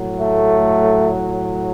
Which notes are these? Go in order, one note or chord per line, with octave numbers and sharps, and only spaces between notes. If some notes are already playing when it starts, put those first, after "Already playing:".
Already playing: A2 F#3
A3